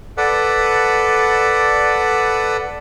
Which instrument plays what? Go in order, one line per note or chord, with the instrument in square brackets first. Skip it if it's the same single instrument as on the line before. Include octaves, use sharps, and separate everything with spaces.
[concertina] A4 B4 D5 F#5